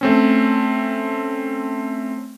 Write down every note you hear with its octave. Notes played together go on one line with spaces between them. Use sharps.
A3 C4 C#4